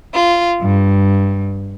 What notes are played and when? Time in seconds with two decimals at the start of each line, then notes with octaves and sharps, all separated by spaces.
0.13 F4
0.62 G2